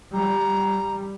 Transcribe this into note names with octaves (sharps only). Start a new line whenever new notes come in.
G3 A#5